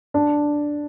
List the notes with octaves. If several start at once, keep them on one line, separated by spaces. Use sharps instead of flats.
D4